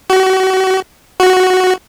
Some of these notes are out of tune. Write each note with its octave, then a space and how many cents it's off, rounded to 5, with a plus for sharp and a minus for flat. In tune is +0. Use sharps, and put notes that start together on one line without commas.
F#4 +35
F#4 +0